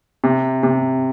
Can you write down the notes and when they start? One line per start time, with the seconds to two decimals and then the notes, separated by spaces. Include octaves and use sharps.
0.24 C3
0.63 C3